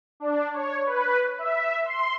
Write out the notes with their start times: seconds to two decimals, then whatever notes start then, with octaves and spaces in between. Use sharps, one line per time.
0.20 D4
0.53 C#5
0.86 B4
1.38 E5
1.85 C6